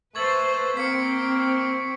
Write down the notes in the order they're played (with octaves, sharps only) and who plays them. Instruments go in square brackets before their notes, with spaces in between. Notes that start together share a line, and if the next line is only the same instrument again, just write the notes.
[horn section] A3 [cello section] B4 C5 [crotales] C#6 G#6 F#7
[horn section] A#3 [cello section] C4 [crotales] B6 C#7